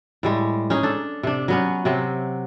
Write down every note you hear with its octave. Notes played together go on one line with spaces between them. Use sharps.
A2 G3 G#3
C#4 D#4 G#4
D4 A4
C3 D4
F#3 B3 C#4
C3 F#3 C4